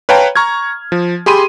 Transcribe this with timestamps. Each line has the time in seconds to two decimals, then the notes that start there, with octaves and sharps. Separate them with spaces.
0.09 B4 C#5 F5 G5 A5 A#5
0.36 A#5 C#6 F6 G#6
0.92 F3
1.26 G4 G#4 B5 C6 D#7